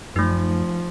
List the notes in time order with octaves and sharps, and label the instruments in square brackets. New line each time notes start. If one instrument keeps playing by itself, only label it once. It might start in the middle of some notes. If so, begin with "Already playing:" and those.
[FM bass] F#2 [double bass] F3 [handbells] A3 D#4